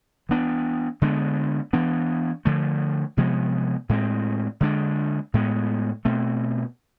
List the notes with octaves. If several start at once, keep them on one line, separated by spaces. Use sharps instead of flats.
E3 B3 D4
D3 G#3 B3 D4
E3 B3 D4
D3 F3 A3
C3 F3 G#3 B3
A2 G#3 C4
D3 G#3 B3 D4
A2 G#3 B3
B2 A3 C4